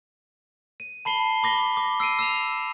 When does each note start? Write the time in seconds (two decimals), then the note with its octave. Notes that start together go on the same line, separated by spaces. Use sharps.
0.80 D#7
1.05 A5 B5 C7 G7
1.43 B5 D6 A#6 B6 G7
1.77 D6
2.00 E6 C7 D7 D#7
2.19 E6 E7 F7